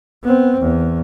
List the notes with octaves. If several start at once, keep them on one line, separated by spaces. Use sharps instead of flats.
B3 C4
E2